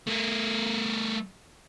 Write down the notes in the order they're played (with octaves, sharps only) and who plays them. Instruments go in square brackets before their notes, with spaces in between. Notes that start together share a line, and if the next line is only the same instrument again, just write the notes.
[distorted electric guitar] A3 A#4